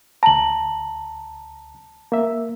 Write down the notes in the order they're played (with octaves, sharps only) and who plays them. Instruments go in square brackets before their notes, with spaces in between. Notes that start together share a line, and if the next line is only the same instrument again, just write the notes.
[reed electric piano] D2 A#5 [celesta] A5 F#7
[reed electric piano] A#3 E5